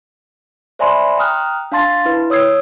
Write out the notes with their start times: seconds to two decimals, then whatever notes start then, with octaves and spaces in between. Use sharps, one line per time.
0.79 C5 D5 E5 G#5 B5 C6
1.18 G5 A#5 D#6 F6 F#6
1.72 D4 F5 A5 C6 A6
2.05 E4 B4
2.30 C#5 D#6 E6 G#6 C7